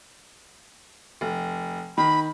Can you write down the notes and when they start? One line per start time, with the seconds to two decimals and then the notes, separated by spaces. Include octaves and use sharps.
1.21 F1
1.98 D#3 B5